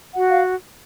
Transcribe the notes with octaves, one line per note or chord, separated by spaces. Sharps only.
F#4 F#5
F5